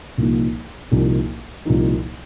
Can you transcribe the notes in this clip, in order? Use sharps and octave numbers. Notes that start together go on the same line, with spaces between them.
C2 A#2 F3 A#3 D#4
C2 A#2 F3 A#3 D#4
C2 A#2 F3 A#3 D#4